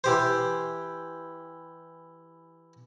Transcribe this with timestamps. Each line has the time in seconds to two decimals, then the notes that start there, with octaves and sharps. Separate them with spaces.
0.04 E3 G4 C5